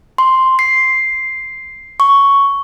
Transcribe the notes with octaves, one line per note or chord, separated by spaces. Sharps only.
C6
C7
C#6